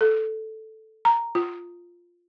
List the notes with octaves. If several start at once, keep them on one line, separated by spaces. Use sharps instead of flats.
A4
A#5
F4